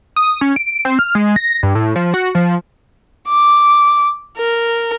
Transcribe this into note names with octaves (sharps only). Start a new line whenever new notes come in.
D#6
C#4
D7
C4
F6
G#3
A#6
G2
A2
F3
F#4
F3
D6
A#4